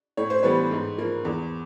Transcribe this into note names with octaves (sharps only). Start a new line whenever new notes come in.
A2 C#5
C5
E3 G3 B3 B4 C#5
G#2
F3 A#3
E2